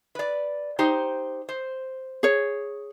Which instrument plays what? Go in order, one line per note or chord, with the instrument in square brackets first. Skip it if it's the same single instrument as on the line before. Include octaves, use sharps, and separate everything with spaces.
[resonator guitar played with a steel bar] B4 D5
D#4 G4 C5
C5
[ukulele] G#4 C#5